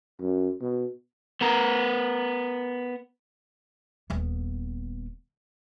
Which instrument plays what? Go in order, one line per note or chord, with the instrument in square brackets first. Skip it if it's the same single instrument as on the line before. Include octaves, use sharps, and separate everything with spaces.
[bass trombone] F#2
B2
[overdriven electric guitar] B3 A#4
[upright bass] D#1 B3